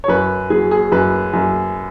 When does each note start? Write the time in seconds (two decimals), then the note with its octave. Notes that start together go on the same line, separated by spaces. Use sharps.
0.04 C#5
0.08 F#2 B4
0.50 F#3 G#4
0.71 G#4
0.92 F#2 B4
1.34 F#2